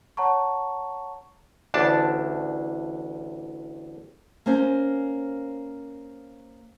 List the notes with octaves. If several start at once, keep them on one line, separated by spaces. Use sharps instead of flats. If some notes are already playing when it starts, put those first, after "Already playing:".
C#5 F#5 A5 A#5 C#6
A1 D2 D4 A5
A#3 C4 C#4 C5